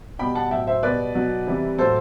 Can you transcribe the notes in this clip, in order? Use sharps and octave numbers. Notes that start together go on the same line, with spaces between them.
B2 G3 G5 B5
F#5 A5
A2 F#3 E5 G5
C5 E5
B2 G3 B4 D5
B2 F#3
C3 E3 G3
A2 F#3 A4 C5